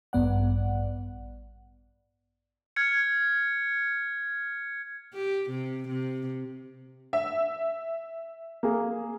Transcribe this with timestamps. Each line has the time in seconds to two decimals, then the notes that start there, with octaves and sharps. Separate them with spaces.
0.13 A1 G2 B3 D5 F#5
2.76 F6 G#6 C#7
5.13 G4
5.50 C3
5.88 C3
7.13 E5
8.63 A#3 G#4